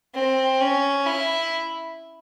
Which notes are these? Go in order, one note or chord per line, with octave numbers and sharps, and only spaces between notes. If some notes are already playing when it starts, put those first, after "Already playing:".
C4
C#4
E4